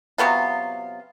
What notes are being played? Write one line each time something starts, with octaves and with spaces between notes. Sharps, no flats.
C3 F#3 B3 F4